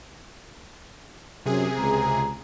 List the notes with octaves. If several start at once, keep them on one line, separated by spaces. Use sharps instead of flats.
F#2 C3 G#4
C#2 A#5